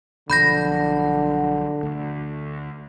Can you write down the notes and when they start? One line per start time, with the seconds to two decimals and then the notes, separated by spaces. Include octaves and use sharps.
0.30 B1 D3 F3 B5 G6 A#6
1.83 D2